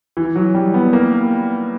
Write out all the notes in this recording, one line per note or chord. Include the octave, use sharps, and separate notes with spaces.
E3
F#3
G3
B3
A#3